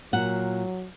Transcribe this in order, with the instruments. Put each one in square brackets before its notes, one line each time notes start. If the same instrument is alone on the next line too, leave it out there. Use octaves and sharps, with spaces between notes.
[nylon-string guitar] A#2 F#5 [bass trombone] F#3